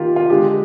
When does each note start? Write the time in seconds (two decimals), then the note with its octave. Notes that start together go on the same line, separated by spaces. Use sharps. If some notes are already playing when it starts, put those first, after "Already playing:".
Already playing: D#3 A#3 F4 G4
0.16 F4
0.29 D3 G#3 G4